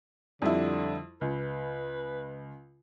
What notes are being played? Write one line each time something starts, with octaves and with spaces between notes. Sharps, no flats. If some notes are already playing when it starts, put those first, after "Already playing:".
F2 D3 G3 E4
C#2 B4